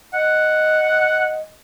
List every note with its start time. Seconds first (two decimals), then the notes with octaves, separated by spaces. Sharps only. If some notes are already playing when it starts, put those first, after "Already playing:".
0.14 D#5 F#5